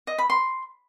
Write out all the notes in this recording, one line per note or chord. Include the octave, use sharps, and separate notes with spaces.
D#5
B5
C6